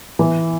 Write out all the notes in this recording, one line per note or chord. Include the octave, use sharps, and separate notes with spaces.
E3